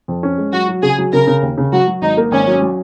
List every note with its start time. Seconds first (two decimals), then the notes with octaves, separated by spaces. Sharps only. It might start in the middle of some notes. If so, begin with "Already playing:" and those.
0.08 F2
0.23 C#4
0.38 G#3
0.53 F#3 F#4
0.68 F#3
0.82 C#3 G#4
0.98 F#3
1.13 C#3 A#4
1.27 C#3
1.42 D#2
1.58 C#3
1.72 F#3 F#4
1.87 F#3
2.02 G#1 D#4
2.17 A#3
2.32 G#1 C#4
2.47 F#3
2.62 F#3